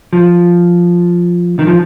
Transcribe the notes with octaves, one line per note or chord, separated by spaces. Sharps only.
F3
D#3
F3